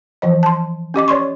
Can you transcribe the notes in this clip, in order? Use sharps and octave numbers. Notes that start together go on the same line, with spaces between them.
E3 F3 D#5
A5 C6
C#4 G4 D#5 D6
C#5 D5 C6 C#6